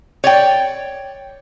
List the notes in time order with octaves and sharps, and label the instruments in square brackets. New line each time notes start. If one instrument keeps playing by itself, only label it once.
[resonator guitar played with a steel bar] C#5 D5 G5